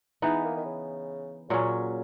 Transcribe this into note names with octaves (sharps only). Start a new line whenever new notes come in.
E3 G#3 B3 D#4
A#3
D#3
C#3
A#2 C#3 F#3 C#4